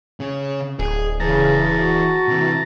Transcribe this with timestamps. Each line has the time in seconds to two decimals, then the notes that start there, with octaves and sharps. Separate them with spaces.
0.20 C#3 C#4
0.79 D1 G#4
1.20 C#3 E3 G#4 A5 A#5
1.74 F#4
2.28 C3 E3